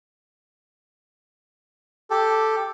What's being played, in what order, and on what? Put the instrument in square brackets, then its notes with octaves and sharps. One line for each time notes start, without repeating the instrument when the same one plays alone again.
[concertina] G4 A4